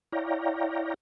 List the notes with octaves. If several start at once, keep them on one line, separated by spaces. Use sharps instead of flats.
E4 C#5 D5 F5 G5 A#5